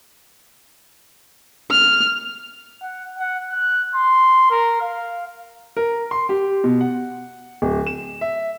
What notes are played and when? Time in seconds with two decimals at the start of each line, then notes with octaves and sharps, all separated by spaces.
1.71 F6
2.82 F#5
3.19 F#5
3.50 F#6
3.95 C6
4.51 A#4
4.81 F5
5.77 A#4
6.11 C6
6.29 G4
6.64 B2
6.81 F#5
7.62 D1
7.87 E7
8.21 E5